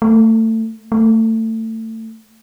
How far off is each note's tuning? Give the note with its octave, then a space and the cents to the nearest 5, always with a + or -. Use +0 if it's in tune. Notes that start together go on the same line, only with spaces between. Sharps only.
A3 +25
A3 +25